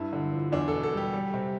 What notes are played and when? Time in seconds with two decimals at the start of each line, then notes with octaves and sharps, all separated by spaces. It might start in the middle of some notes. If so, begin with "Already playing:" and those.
Already playing: G2 E4
0.13 D3
0.33 F3
0.52 E2 D4
0.68 B2 A4
0.83 A4
0.93 G3 G4
1.13 G3
1.34 C3